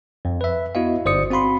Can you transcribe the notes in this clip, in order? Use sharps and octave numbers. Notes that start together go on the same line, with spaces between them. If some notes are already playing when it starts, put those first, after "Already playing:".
F2
B4 E5
B3 E4 F#4 D#5 F5
G1 C5 D5 D#6 C#7
C4 F#4 F5 B5 C6